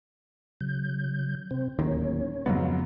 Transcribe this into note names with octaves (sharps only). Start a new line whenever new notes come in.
C#3 F#3 G6
C3 C4 C5
D1 D#2 D#3 C#4 C#5
F2 G#2 C#3 F#3 B3 F5